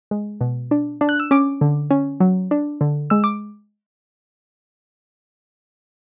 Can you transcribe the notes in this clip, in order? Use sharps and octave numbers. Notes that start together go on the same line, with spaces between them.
G#3
B2
D4
D4
F#6
E6
C#4 D6
D3
C#4
F#3
D4
D3
G#3 E6
D6